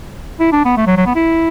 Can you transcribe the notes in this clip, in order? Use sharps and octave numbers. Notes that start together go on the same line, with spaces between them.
E4
D4
B3
A3
F#3
F#3
B3
E4